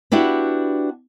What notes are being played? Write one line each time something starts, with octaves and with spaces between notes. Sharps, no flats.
B3 D4 E4 F#4 G4